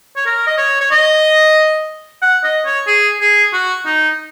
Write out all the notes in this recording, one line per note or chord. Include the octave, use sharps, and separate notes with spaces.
C#5
A#4
D#5
C#5
C#5
D#5
F#5
D#5
C#5
G#4
G#4
F#4
D#4